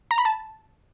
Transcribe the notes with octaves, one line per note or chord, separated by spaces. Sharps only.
A#5
B5
A5